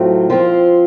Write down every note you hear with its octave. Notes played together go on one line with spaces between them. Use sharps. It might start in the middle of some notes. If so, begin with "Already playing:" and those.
Already playing: A2 F#3 A3 C4 F4
F3 C4 F4